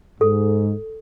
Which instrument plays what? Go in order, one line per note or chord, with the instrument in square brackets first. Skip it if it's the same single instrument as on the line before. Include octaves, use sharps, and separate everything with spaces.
[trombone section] G#2 [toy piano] A4